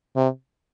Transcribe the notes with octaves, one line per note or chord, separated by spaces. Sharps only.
C3